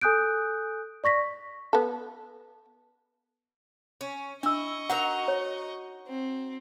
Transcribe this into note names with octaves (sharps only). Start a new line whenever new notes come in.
A4 G#5 D#6 F#6 G6 D7
D5 C#6 A#6 B6
B3 A4
C#4
D4 E4 D#5 C#6 E6
D#4 F#4 A#4 F#5 A#5
C#5
C4